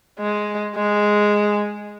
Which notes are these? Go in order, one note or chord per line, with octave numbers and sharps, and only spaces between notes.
G#3
G#3